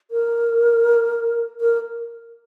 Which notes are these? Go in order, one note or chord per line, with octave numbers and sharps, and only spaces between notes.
A#4
A#4